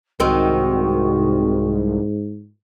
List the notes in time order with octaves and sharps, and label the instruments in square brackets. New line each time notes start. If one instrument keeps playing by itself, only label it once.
[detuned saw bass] C2 [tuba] G#2 [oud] D#3 C4 [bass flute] F#4